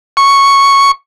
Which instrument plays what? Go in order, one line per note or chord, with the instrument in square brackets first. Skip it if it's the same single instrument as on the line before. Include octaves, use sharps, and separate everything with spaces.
[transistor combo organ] C#6